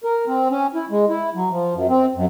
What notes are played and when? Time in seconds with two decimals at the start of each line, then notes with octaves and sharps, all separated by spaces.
0.04 A#4
0.27 C4
0.51 C#4
0.75 E4
0.90 G#3
1.09 E4
1.35 F#3
1.51 F3
1.74 F#2
1.89 C4
2.15 F#2